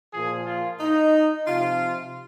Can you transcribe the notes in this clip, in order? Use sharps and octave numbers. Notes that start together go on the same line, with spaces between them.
A#2 F3 G#4
F4
D#4
C3 F3 F4